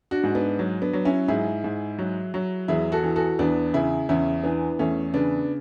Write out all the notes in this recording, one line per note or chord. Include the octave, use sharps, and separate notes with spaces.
D4 F#4
G#2
B3 D4
F#3
B3 D4
F#3
C#4 E4
G#2 E4 G#4
G#2
F#3
F#3
E2 E4 G#4
F#4 A4
E3
F#4 A4
E2 B3 D4
C#3 E4 G#4
E2 C#4 E4
E3 B3 D4
E2 A3 C#4
C#3 B3 D4